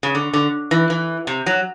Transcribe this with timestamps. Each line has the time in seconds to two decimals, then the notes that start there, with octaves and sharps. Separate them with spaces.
0.03 C#3
0.15 D3
0.34 D3
0.71 E3
0.90 E3
1.27 C3
1.46 F#3